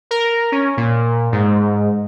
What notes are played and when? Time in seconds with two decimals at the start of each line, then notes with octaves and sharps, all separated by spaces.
0.11 A#4
0.52 C#4
0.77 A#2
1.32 G#2